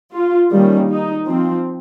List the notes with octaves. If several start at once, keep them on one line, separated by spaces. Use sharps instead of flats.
F4
D#3 G3 A#3 C#4
D#4
F3 C4